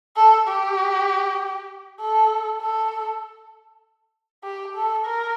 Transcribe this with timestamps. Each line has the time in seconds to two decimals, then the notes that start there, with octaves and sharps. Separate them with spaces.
0.16 A4
0.47 G4
2.00 A4
2.61 A4
4.44 G4
4.75 A4
5.05 A#4